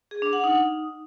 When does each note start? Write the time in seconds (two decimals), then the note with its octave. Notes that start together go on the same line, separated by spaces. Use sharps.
0.11 G#4
0.22 D4
0.33 F#5
0.44 D#4